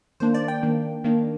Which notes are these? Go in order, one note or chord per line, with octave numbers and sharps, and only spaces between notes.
D#3 A#3 D4 C5
D5
G5
D#3 A#3 D4
D#3 A#3 D4